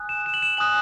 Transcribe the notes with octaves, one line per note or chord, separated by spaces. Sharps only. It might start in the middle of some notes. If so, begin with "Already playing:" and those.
Already playing: G#5 D#6 F#6
E7
E7
F#7
E7
G#5 D#6 F#6 F#7